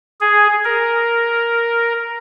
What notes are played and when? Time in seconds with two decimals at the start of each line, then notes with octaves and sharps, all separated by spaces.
0.20 G#4
0.64 A#4